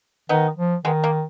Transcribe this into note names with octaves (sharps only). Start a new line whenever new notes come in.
D#3 B3 D#4
F3
D#3 G#3 B3
A#3